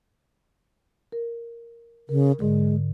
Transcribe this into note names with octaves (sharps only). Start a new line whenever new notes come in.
A#4
C#3 A#4
G#2 D3 G#3